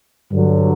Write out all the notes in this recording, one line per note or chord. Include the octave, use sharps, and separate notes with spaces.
G2 D3 F#3